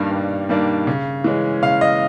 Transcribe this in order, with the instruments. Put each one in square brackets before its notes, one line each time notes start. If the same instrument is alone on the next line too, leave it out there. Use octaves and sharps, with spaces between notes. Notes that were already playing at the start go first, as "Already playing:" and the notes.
Already playing: [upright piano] G2 D#3 G3 A#3 D4
G2
D#3 G3 A#3 D4
C#3
E3 G#3 C#4
C#3 F5
D#5